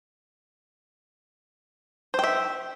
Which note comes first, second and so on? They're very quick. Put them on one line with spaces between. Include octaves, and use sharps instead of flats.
C5 G5 E5